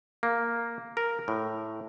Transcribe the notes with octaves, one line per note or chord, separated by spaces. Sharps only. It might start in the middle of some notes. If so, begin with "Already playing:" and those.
A#3
A#4
A2